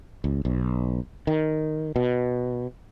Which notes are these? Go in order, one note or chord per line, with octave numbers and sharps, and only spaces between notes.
C#2
B1
D#3
B2